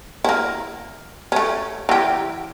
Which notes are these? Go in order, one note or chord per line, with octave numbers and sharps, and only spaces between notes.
A#3 E4
A3 C#4
E3 G4